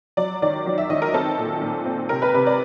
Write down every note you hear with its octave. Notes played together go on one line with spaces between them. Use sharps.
F#3 D5
D#3 D5
F#3
E5
D#3 D#5
A#4
C4 A4
A#2
A#2
C4
C3 A#4
B4
C3 B4
D5